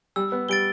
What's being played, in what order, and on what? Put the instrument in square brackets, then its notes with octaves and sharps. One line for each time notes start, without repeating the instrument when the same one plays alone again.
[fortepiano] G3 [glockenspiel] E6
[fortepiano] B3
[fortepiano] G3 [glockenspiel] A6 D7 G7